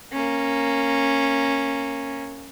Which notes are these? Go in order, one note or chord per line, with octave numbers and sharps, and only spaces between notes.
A#3 C#4